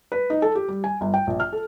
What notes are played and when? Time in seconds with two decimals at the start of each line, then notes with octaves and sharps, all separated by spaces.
0.12 B4
0.30 D#4
0.42 A4
0.55 G4
0.68 G3
0.84 G#5
1.01 G1
1.14 G5
1.27 A#1
1.40 F6
1.53 A4